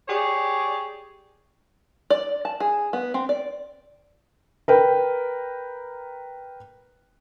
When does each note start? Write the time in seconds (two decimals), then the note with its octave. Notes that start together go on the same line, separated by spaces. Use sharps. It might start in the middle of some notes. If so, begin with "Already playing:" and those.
0.08 G4 G#4 C#5 D5
2.10 D5
2.45 A5
2.60 G#4
2.93 B3
3.14 C4
3.29 D5
4.68 A#4 B4 G5